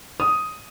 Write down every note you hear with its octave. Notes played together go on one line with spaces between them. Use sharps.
D#6